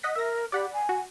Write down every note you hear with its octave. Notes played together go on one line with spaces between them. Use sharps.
D#5 F#5 B6
A#4 E5 A#6
G4 D5 F#5 B5
G#5
F#4